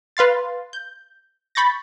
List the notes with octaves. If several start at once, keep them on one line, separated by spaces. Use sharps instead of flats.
B4 F5 C6 A6
G6
B5 C#6 G6 A6 A#6